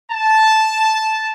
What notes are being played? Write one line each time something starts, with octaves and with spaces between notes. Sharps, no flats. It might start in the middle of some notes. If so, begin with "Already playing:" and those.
A5